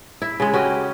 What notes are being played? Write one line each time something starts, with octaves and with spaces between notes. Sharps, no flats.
E4
C#3 G#3
C#4 F#4 G4 D#5